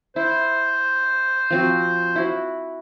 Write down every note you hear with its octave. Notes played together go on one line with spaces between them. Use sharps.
E4 C5
F3 C4 F#4
E4 F#4